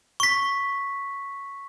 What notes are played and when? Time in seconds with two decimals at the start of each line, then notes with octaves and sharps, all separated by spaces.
0.20 C#6 B6